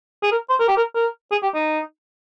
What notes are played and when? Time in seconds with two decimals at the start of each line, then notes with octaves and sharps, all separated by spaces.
0.23 G#4
0.32 A#4
0.50 C5
0.60 A#4
0.68 G4
0.77 A#4
0.95 A#4
1.31 G#4
1.43 G4
1.54 D#4